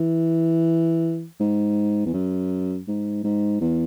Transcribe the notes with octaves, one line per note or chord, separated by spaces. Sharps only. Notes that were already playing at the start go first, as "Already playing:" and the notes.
Already playing: E3
G#2
E2
F#2
G#2
G#2
E2